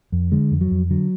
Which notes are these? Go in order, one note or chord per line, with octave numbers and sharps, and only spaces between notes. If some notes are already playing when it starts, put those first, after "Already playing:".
F2
D3 G#3
F2
F#3
F2
D3 F#3